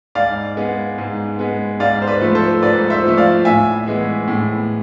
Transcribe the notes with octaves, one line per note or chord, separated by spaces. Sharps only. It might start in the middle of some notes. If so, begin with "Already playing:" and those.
G#2 D5 F5
G#3 B3
G#2
G#3 B3
G#2 D5 F5
C5
B4 D5
F3 A3
A4 C5
G#2 B4 D5
C5 E5
F3 A3
D5 F5
A2 E5 G#5
E3 G#3 B3
A2